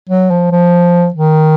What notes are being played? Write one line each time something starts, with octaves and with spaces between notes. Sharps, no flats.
F#3
F3
F3
D#3